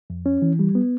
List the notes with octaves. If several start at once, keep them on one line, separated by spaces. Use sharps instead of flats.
F2
C#4
E3
G3
B3